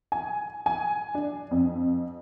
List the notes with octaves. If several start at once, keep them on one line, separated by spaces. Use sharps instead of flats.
G#5
G#5
D4
F2